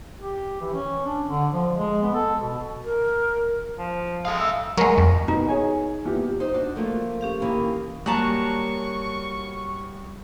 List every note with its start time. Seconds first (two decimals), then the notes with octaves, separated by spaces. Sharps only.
0.21 G4
0.60 E3
0.73 C#4
1.05 D4
1.28 D3
1.52 F3
1.73 G#3
2.02 B3
2.14 A4
2.40 B2
2.84 A#4
3.78 F3
4.25 G#3 A4 F5
4.39 E5
4.77 F#3 G#3 A#4
4.98 F2
5.28 B2 D#4
5.49 G#4 C#5 G#5
6.05 E2 A#2 G4
6.40 D#4 C5
6.54 D4 F#4
6.76 F3 A3 A#3
7.21 C#4 G4 F5
7.40 D#3 E3 A#3
8.06 F#3 G3 A#3 A5 A#5 C#6 F#6